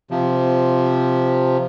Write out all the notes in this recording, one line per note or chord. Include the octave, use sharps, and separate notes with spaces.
C3 F3